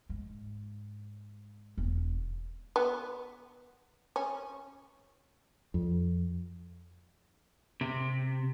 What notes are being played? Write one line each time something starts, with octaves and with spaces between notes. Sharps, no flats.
G#2
E1
B3
C#4
F2
C3